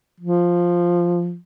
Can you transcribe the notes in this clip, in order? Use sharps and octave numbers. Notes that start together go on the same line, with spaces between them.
F3